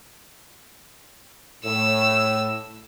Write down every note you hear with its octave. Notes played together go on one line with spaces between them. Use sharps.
A2 E6